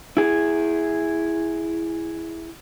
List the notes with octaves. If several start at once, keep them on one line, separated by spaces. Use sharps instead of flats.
E4 G#4